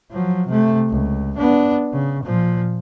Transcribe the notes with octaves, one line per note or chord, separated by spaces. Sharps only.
F3 F#3
C3 A3
C#2
B3 D4
C#3
A#2 F3